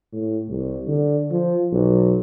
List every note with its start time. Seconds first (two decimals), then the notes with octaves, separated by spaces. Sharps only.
0.12 A2
0.50 C2
0.87 D3
1.31 F3
1.72 B1